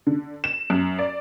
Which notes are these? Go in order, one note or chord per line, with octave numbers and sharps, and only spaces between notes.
D3
E7
F#2
D5